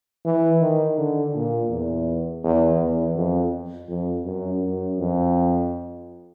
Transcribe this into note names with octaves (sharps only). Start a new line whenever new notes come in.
E3
D#3
D3
A#2
E2
E2
E2
F2
F2
F#2
F#2
F2